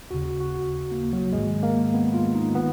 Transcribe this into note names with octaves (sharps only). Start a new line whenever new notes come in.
D#2 C#3 F#4
F#4
A#3
F#3
A#1 G#2 D#3 G#3
A#3
B3
F4
D#4
D#3 B3